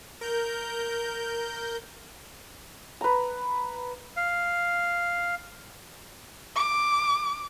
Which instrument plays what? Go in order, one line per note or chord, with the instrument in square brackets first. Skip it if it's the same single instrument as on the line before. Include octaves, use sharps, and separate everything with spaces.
[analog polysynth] A#4 G6
[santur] B4 A#5
[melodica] F5
[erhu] D6